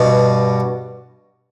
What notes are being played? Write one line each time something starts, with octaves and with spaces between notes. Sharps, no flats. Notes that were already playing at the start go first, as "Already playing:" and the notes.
Already playing: G2 B2